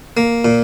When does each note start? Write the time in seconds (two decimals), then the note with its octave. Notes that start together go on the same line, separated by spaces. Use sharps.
0.17 A#3
0.45 A#2